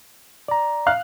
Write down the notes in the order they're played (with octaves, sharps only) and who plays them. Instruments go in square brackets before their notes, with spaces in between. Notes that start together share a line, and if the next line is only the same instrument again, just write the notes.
[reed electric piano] D5 A#5
[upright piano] F5 F6 F#6